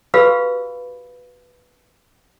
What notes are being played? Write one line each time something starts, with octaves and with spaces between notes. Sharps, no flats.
F#4 G4 B4 F5 B5 E6